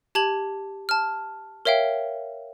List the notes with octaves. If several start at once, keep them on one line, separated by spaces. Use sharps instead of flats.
G4 A5 G#6 F#7
A5 F6
A#4 C#5 E5 F5 G5